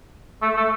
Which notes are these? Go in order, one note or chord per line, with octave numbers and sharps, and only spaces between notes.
A3
A3